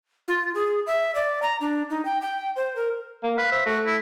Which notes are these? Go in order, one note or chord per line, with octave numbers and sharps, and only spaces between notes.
F4
G#4
E5
D5
A#5
D4
D#4
G5
G5
C5
A#4
A#3
B4 F5
C5 E5
A3 F#4
E4